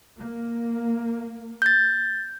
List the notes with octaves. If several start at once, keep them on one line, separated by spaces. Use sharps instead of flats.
A#3
G6 A6